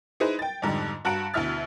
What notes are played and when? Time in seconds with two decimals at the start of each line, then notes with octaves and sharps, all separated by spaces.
0.20 D#4 E4 G#4 B4 C5
0.39 G5 A6
0.62 F2 G#2 D3 G3
1.05 G2 F#4 A5 A#5 F#6 D7
1.34 D2 B2 E4 E5 F6 A6